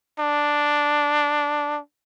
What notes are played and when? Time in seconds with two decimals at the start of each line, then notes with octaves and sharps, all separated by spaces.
0.19 D4